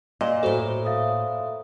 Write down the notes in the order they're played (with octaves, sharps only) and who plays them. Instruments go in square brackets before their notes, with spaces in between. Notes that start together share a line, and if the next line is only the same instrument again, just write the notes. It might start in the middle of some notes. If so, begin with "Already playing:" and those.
[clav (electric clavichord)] A#2 [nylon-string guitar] D#5
[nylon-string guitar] A2 F#4 [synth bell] A4 C5
[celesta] E5 F5 D#6